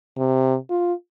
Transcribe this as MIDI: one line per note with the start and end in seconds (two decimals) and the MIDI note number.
0.18 0.56 48
0.70 0.93 65